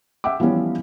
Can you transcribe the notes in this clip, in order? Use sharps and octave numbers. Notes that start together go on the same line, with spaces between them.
E5 F#5 G5 D6
E3 F3 G3 B3 C#4